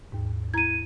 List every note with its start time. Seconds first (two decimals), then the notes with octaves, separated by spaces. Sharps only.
0.12 D#2 G#2
0.54 E4 A#5 G#6 D#7